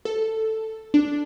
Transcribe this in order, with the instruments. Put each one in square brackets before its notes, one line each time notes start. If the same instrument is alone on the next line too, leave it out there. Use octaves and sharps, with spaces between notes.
[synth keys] A4
D4